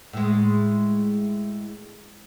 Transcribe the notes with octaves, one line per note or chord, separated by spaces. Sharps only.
A2 G#3